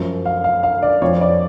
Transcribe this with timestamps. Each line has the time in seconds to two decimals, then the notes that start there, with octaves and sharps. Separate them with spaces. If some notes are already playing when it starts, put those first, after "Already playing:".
Already playing: F#2 F3
0.25 F5
0.44 F5
0.63 F5
0.83 D5
1.02 F2 F3 C#5
1.21 D5